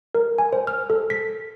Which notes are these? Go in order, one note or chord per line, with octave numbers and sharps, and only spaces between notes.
A#4
G#5
C5
F6
A4
B6